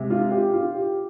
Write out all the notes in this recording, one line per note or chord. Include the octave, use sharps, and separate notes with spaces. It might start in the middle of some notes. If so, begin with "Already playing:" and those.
Already playing: C3 G#3 C4
F4
G4
F4
G4